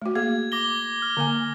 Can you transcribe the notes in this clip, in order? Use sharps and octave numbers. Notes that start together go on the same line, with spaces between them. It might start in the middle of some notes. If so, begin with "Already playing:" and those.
A3 F#4
A#3 G#4 F5 G#6
D6 A#6 G7
F6
D3 A#3 G#5